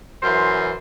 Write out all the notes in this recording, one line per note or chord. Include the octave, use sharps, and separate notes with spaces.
F#2 E3 C5 C6